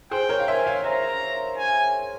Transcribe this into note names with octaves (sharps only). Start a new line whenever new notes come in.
G#4 C5 G5
A#4 C#5
F5
C5 E5 G#5
C#5 F5
C5 E5 A#5
G#5